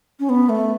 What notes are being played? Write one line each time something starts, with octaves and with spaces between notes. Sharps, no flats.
C#4
B3
A3